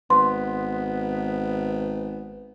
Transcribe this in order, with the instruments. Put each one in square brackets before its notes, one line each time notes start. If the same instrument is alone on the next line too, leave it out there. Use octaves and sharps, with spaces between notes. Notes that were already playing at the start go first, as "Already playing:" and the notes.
[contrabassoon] G#1 [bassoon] B3 [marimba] C6